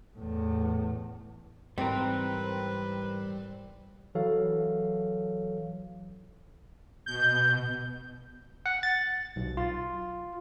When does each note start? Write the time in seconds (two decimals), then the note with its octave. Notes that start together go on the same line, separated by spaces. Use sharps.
0.17 E2 A2
1.78 G#2 E3 G3 C4 A#4 B4
4.15 E3 F#3 A4 C#5 F5
7.06 B2 G6
8.66 F#5
8.83 A6
9.36 B1
9.57 F4